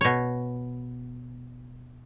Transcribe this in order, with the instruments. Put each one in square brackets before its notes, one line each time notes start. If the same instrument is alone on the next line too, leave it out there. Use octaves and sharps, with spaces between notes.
[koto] B2 C#5